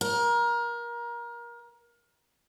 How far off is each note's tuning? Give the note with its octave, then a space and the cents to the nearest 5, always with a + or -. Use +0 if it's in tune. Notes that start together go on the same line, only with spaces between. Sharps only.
A#4 +25